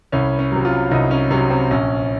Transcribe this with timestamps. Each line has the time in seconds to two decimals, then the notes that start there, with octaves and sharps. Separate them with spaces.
0.12 C2 C#4
0.39 C#4
0.52 C3 F#3
0.65 F4
0.91 C2 D#4
1.11 C#4
1.30 C3 F#3 C#4
1.50 C4
1.71 A#1 C#4